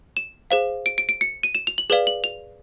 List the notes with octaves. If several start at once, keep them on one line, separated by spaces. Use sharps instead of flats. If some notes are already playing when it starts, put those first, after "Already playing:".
E7
G#4 C5 F5
D7
D7
D7
C#7
D#7
E7
F7
F#7
G#4 B4 D5 F5 F#7
F#7
F7